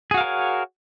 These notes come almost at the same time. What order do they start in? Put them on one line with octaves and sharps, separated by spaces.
G#4 F#4 F5 A#4 C#5